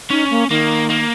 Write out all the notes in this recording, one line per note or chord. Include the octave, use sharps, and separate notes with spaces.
C#4 D#4
A#3
D#3 A#3
A#3